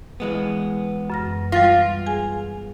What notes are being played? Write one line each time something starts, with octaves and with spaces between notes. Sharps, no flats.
E3 G#3 B3
F#2 F6 A#6
G3 F4 A6 A#6
G#4 G#5